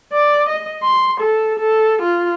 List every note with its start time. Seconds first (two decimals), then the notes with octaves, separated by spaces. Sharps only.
0.12 D5
0.49 D#5
0.83 C6
1.20 A4
1.59 A4
2.02 F4